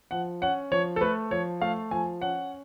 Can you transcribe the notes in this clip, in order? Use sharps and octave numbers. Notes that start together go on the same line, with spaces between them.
F3 F#5
C#4 F#5
F3 C#5
A4
A3 B4
F3 C#5
A3 F5
F3 G#5
C#4 F#5